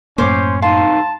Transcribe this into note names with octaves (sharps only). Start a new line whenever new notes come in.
F#2 A2 A#3 C#4 C5 D6
C2 D#4 F5 A5 C6